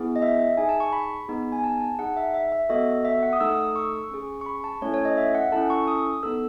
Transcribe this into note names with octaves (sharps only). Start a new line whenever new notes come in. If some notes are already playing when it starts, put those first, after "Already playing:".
Already playing: B3 E4 G#4
D#5
E5
E5
D#4 G#4 G#5
A5
C#6
B5
B3 D#4 G#4
G#5
A5
A5
D#4 G#4 F#5
E5
E5
E5
B3 F#4 A4 D#5
E5
F#5
D#6
A3 D#4 A4 E6
D#6
E6
C#6
C#4 G#4
C#6
B5
A5
A3 C#4 E4 A4 C#5
C#5
D#5
E5
F#5
C#4 E4 A4 A5
C#6
D#6
B3 D#4 A4 E6